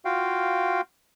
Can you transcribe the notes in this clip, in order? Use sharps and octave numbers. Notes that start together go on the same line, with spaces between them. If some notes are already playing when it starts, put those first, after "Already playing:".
F4 F#4 F5 G5